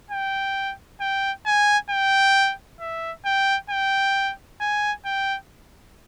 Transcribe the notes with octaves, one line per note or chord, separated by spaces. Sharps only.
G5
G5
G#5
G5
E5
G5
G5
G#5
G5